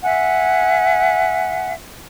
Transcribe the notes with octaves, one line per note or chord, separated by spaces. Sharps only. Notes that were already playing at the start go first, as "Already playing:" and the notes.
E5 F#5 G#5